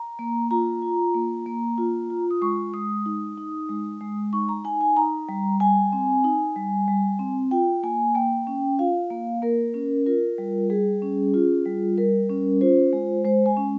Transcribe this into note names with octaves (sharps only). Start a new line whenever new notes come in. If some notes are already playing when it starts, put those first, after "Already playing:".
Already playing: A#5
A#3
F4 A#5
F4
A#3
A#3
F4
F4
D#6
G#3 C#6
G#3 D#6
D#4
D#4
G#3
G#3
D#4 C#6
A#5
D#4 G#5
G#5
D#4 A#5
G3
G3 G#5
C4
D#4
G3
G3
C4
F4 G5
A#3 G#5
A#3 G5
C#4
F4 F5
A#3
A#3 A#4
C#4
F4 A#4
G3
G3 G#4
C#4
F4
G3
G3 A#4
C#4
F4 C5
G#3
G#3 C5
G#5
C#4